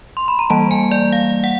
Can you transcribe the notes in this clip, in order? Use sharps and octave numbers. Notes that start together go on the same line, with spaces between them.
C6
B5
A#5
E3 G3 A#3 A5
G#5
D5
F5
F#5